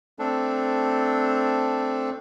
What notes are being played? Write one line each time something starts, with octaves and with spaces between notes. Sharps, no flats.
A3 C4 D4 A4